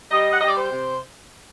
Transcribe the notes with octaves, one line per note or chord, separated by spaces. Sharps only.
G3 D#5
F#5
G3 D#5
D5
C5
C3